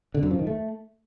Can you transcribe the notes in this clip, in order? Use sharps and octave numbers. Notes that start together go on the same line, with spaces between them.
D3
F#2
F3
D#3
A3